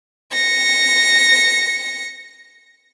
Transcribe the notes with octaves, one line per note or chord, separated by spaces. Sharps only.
A#6 C#7